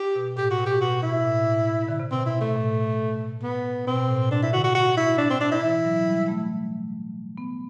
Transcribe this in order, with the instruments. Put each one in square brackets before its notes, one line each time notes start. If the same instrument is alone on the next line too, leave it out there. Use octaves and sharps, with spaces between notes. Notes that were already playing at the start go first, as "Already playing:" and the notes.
Already playing: [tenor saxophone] G4
[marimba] B2
[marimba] A2 [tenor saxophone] G4
[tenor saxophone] F#4
[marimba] B2
[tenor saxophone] G4
[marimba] B2 [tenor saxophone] F#4
[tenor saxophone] E4
[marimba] A2
A2
D3
C3
[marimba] B2 [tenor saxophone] C4
[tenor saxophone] E4
A3
[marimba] A2
[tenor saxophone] B3
[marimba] B2 [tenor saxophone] C4
[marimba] A2
[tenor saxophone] D4
E4
[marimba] D3 [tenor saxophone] F#4
[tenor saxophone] F#4
F#4
E4
D4
C4
D4
E4
[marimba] E3
F#3
G3
A3
B3